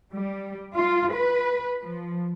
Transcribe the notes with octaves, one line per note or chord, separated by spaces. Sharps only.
G3
F4
B4
F3